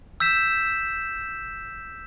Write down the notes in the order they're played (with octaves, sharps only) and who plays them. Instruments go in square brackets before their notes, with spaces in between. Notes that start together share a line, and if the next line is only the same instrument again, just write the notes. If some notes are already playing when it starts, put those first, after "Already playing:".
[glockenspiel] E6 G6 B6 E7